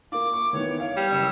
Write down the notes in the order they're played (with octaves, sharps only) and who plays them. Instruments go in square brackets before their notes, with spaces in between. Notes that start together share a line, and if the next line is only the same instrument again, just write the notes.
[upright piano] A#3 F4 [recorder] D6
[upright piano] C#6
[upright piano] D#3 E3 B3 [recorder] C#5
[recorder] C#5 [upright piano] F5
[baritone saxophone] G3
[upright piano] F#1 C#7 E7 [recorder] E6